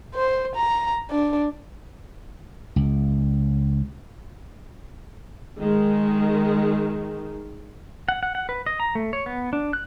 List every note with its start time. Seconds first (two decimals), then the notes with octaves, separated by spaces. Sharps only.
0.15 C5
0.56 A#5
1.11 D4
2.76 C#2
5.57 D#3 G#3
8.09 F#5
8.23 F#5
8.35 F#5
8.49 B4
8.66 D#5
8.80 A#5
8.95 A3
9.13 C#5
9.26 B3
9.53 D4
9.73 F#6